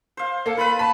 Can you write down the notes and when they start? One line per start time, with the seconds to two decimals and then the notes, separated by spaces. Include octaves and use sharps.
0.17 C5 F5
0.46 A#3 A4
0.57 F4 B4 B5
0.79 A5 B5